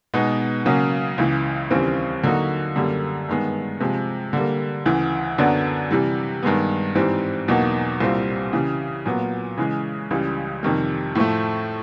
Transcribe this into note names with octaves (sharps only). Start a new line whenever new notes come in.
B2 G#3 B3 D#4
C#3 F#3 A#3 C#4
C#2 C#3 E3
D#2 C#3 E3 G3 C4
D3 F#3 A#3 D#4 F#4
F#2 D3 G3 A#3
G2 D#3 G#3 B3
C3 F3 G#3
D3 G3 A#3
D2 C#3 E3
F#2 D3 F#3 B3 D4
C3 E3 G3
G2 D#3 G#3 B3
G#2 E3 G3 C4
E2 B2 F#3 A#3 D#4
C2 A#2 G3 C4 F4
C#3 E3 G3
A#2 F#3 B3
C#3 E3 G#3
C#2 C#3 E3 G3
F2 C3 D#3 G3
A2 F3 A3